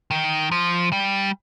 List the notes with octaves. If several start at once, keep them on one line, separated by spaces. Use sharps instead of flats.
D#3
F3
G3